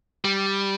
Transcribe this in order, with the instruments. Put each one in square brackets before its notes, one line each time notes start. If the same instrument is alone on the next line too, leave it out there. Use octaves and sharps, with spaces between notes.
[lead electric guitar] G3